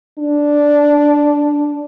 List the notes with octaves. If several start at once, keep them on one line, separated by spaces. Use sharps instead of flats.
D4